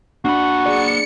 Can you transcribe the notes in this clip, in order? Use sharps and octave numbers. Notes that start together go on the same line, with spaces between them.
A#3 D4 F#4 B5
G#4 D5 C#7